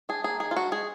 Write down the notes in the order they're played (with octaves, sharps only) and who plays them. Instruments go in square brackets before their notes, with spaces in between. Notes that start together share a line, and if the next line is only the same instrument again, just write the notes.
[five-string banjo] D4 G#4
A#3 G#4
D#3 G#4
F4
D4 F#4
G#3 G#4